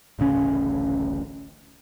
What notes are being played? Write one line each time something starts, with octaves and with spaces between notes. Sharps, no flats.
D1 A1 C#3 C#4